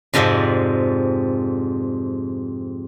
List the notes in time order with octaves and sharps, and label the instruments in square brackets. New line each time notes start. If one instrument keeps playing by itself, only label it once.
[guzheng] F2 G#2 C3 F3 D5